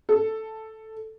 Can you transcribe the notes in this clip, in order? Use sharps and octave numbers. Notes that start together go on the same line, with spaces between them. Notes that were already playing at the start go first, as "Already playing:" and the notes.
A4